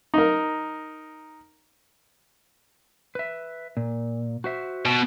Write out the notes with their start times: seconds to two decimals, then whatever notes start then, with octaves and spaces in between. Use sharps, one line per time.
0.14 D#4 A#4
3.15 B4 E5
3.77 A#2
4.44 F#4 C5 E5
4.85 B2